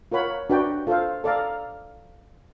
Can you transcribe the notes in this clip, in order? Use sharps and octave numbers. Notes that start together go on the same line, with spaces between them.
F4 A#4 C#5 F#5 B5
D4 F#4 B4 D5 G5
F4 A4 C5 F5
A4 D5 F5 A#5